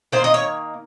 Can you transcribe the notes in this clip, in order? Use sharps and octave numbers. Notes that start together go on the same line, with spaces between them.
D#3 A#3 C5
D#5
C#5